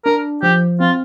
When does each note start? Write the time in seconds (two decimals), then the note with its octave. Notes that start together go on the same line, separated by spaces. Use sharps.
0.05 D4 A#4
0.43 F3 G4
0.80 C4 F4